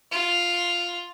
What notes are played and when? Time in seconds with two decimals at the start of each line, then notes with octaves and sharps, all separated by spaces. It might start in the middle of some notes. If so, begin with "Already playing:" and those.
0.12 F4